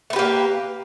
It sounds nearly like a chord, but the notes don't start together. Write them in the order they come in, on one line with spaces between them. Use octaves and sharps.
A3 B4 G4 A#3